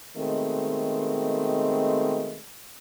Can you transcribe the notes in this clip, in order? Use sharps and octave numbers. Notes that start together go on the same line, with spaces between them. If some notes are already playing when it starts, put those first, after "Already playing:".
B2 D#3 G#3 A3 C4